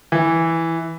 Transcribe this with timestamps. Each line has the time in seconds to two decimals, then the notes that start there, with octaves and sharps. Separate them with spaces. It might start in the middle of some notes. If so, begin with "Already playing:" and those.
0.12 E3